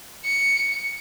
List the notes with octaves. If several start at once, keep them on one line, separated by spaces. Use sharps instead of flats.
C#7 D7